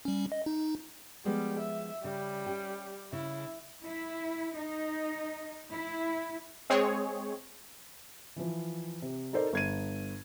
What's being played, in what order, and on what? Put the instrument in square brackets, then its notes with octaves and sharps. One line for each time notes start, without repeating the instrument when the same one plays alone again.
[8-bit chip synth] G3 C#4
D#5
D#4
[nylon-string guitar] F3 G#3 B3 [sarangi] G3
[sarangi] E5
[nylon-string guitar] C#3 [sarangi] G3
[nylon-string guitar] C#4 G4
[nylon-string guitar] C#3 [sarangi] E4
[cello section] E4
D#4
E4
[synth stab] G#3 C4 G#4 C#5
[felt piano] E3 F3
C3
D#4 A4 A#4 C5 D5
G1 G#6 D#7